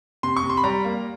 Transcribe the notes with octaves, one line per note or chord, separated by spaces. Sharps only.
C3 C6
C#6
C3
C6
B5
G3 A#5
A#3